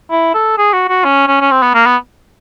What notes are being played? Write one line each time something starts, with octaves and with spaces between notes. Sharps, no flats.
E4
A4
G#4
F#4
F#4
C#4
C#4
C#4
C4
B3
A#3
B3